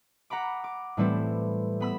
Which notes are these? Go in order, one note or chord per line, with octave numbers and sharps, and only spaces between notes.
F#5 A#5 B5 D6
D6
A2 E3 G3 A3 C4 E4
B3 B5 E6